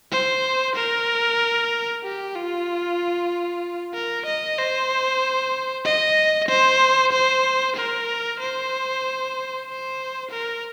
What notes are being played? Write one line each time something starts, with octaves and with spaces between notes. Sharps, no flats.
C5
A#4
G4
F4
A#4
D#5
C5
D#5
C5
C5
A#4
C5
C5
A#4